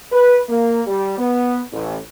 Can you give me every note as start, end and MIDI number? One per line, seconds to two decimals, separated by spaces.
0.12 0.40 71
0.49 0.81 58
0.87 1.18 55
1.18 1.60 59
1.72 1.97 33